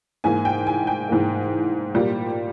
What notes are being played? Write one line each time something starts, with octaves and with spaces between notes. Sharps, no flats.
G#2 E3 A#3 G#5
G5
G#5
G5
G#2 E3 A#3
A#2 G3 A#3